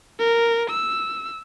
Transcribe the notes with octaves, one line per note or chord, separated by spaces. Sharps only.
A#4
E6